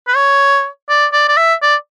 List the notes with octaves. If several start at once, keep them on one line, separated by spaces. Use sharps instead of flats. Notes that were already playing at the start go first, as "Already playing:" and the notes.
B4
C#5
D5
D5
D5
E5
D5